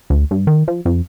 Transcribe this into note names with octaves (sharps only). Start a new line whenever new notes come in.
D2
G2
D#3
F3
F2